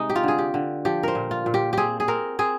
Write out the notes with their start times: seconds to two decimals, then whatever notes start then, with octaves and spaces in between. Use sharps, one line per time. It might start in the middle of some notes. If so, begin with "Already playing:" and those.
Already playing: C3 G#3 D#4
0.09 G4
0.15 F4
0.23 D3 G#4
0.38 G4
0.54 D3
0.85 F3 G4
1.03 A#4 C5
1.15 A#2
1.31 F4
1.46 A#2
1.54 G4
1.73 C4 G4 G#4
2.00 G#4
2.08 C4 A#4
2.39 C4 G#4